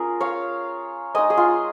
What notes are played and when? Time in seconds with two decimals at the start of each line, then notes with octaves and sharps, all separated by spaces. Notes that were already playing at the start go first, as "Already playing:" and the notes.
Already playing: C#4 F4 G#4 A#4
0.21 C#5 F5
1.14 G#3 D#4 D#5 G#5
1.30 G#4
1.37 F4